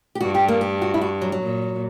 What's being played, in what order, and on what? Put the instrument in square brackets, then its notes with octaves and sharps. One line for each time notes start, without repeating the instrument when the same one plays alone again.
[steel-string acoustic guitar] G4
[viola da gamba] G2 [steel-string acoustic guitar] F#4
[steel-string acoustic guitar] G4
A#3
G4
F#4
E4
F#4
F#3
F#3
[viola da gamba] A#2